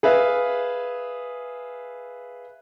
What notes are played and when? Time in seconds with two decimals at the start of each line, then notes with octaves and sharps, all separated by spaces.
0.03 G#4 B4 E5 F5